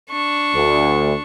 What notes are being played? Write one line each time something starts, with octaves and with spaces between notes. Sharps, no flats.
D4 C#6
D2